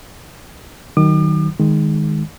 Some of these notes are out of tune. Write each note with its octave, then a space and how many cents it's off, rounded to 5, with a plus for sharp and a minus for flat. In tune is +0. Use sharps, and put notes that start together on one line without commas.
D#3 -5 F#3 +25 D6 +45
D#3 +0 G#3 +0